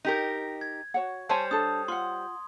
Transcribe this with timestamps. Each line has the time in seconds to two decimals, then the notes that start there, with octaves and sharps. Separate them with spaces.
0.05 D#4 G4 A#4
0.61 G#6
0.94 F#4 C#5 F#5
1.29 G3 C5 C#5 G#5 A5
1.51 D4 A4 D#6
1.88 F4 F#5 C6